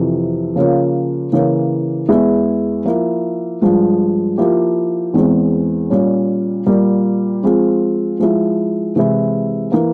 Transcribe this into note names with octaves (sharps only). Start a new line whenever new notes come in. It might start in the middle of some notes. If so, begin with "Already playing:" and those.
Already playing: F2 C3 E3
C#3 F3 A#3 C#4 F4
C#3 E3 A#3 C#4
E2 E3 G#3 E4 G#4
F3 A#3 E4
G2 F3 G#3
F3 A#3 E4 G4
E2 E3 G#3 C4
A#2 G3 C#4
A#2 G3 A#3
F3 G#3 C4 F4 G#4
F3 G#3 E4
C3 E3 G#3 E4
E3 A#3